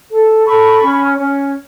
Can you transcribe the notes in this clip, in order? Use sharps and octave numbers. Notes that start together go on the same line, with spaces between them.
A4
A4 B5 C#6
C#4
C#4